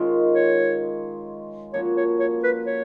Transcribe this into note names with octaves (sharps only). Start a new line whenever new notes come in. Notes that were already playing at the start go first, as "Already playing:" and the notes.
Already playing: D#3 G#3 C#4 F4
C#5
F3 A#3 C#4 F#4 C#5
C#5
C#5
B4
C#5